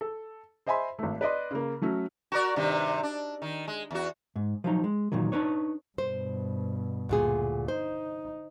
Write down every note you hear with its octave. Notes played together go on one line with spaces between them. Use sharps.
A4
C5 D#5 E5 G#5 B5 C6
G#1 A3
B4 D5 D#5 C6
C#3 A#3
F#3 A3 C#4 F#4
F#4 A#4 D5
G2 C3 D#3
D4
D#3
G#3
E2 F#4
G#2
F3 F#3 D#4
G#3
A#2 D#3 E3 F#3
D4 D#4 B4 C#5
G2 B2 C5
D2 A#2 G#4
D#4 C5